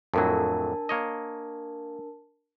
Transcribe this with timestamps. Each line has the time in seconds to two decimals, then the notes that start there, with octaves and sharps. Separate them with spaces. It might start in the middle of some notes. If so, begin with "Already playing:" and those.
0.14 F2 A2 F#3 D4 A#4 A5
0.89 A#3 C#5 D#5